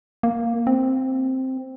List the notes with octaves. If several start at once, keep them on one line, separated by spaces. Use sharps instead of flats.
A#3
C4